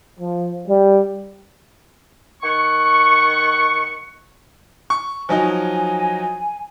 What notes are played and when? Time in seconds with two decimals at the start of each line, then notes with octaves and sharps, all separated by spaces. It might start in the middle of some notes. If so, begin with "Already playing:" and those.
0.19 F3
0.67 G3
2.42 D#3 F#5 C#6
4.90 C#6
5.29 F3 F#3 D#4 G#5